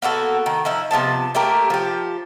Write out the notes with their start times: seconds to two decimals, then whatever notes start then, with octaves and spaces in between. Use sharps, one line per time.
0.02 A#3 B3 F#4 A4
0.46 D#3
0.65 F3 D#4 E4
0.91 C3 F3 B3 A5
1.35 A3 A#3 G4 A#4
1.70 F3 G4